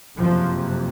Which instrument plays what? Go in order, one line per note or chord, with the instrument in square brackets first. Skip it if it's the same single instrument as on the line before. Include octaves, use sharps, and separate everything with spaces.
[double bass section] F#1 F2 C3 F3